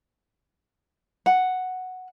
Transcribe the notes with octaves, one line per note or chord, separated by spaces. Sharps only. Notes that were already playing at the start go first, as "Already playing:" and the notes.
F#5